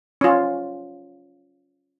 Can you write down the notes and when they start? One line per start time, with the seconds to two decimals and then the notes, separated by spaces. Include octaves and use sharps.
0.21 C#4 F4